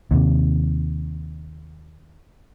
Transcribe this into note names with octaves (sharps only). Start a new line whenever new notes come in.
D#2 C3